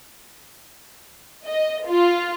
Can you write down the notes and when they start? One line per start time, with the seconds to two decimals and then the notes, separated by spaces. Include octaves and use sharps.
1.45 D#5
1.87 F4